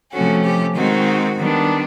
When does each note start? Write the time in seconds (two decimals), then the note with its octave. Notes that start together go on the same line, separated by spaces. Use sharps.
0.12 C3 F3 A3 C#4 F#4
0.43 G4
0.74 D#3 G#3 C4 D#4 F#4
1.37 D#3 G3 B3 D4